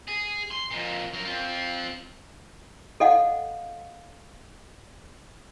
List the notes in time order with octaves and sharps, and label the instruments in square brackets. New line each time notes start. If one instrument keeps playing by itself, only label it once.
[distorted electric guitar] G#4
C6
F2 A#2
F#3 A#4
C4 F4
[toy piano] A4 D#5 F5 F#5